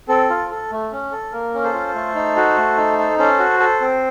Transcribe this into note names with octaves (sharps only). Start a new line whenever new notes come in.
C4 A4
F4
A4
A3
C#4
A4
A#3 A#4
C#4
A4 C5
F4
A3
D#4
F#4
A3
D#4
A4
C#4 A4 C5
F#4
A4
C4